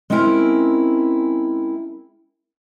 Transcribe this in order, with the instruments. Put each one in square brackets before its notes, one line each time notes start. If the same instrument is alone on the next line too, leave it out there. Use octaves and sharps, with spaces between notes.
[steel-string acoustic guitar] G#3 C4 C#4 E4 A#4